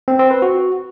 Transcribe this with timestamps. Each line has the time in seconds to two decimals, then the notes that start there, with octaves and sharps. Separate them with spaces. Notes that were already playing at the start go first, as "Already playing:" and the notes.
0.08 C4
0.19 C4
0.31 B4
0.42 F#4